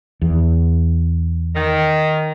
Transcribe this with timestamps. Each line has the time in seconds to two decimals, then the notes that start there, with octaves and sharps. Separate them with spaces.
0.22 E2
1.56 D#3